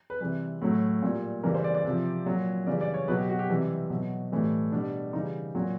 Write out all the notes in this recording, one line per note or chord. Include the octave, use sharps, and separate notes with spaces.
B4
C3 E3 G3 B4
A2 F#3
A#2 G3
C#3 E3 G3 A#4
C5
D5
D5
C3 F3
A#2 F#3
C#3 E3 G3 D5
D5
C#5
B2 F#3 B4
G4
F#4
G4
C3 E3 G3
B2 F#3
A2 E3 G3
B2 G3 D4
C#3 E3 G3 D#4
A#2 F#3